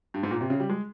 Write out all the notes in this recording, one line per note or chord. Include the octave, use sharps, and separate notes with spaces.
G2
G#2
A#2
C3
C#3
G3
G#3